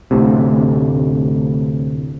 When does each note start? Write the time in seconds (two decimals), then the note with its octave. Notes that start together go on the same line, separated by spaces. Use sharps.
0.11 D2 A2 C3